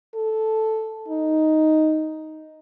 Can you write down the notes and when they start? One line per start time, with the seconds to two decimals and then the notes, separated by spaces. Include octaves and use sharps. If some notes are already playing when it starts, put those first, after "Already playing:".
0.15 A4
1.08 D#4